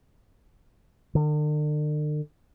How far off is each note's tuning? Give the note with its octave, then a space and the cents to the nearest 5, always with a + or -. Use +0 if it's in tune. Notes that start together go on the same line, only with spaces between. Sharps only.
D3 +45